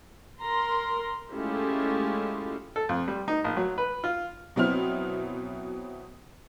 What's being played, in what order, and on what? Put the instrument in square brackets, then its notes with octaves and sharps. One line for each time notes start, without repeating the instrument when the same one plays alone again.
[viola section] A#4 A#5 C6
G#3 A3 C#4 E4 F4 G4
[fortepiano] A4
F2
G3
D#4
A#1
F#3
B4
F4
[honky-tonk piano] B2 F#3 B3 C4 E4 F6